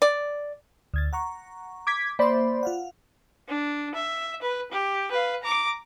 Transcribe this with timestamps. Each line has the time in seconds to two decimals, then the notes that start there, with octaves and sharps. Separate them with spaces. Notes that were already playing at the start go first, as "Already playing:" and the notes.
0.02 D5
0.94 D2 G#6 A6
1.13 F#5 A#5 C#6
1.87 D6 G#6 B6
2.19 A#3 C5 D5 E5 B5
2.63 F4 F5 F#5
3.48 D4
3.95 E5
4.42 B4
4.72 G4
5.11 B4 F5
5.43 A#5 D6